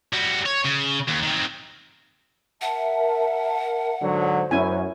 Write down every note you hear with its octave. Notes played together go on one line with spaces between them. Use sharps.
G3 F#4
C#5
C#3
D#2
D#3 C4
A#4 E5 F#5 A5
G#2 D3 F#3 C5
F#2 C#4 E4 G#5